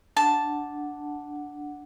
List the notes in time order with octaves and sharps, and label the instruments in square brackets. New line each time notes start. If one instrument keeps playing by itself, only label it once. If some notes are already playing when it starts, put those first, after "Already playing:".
[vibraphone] D4 F#5 [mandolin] A5